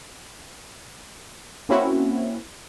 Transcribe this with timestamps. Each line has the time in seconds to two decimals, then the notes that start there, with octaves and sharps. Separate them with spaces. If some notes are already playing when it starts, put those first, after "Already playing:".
1.69 A#3 C4 C#4 E4 F#4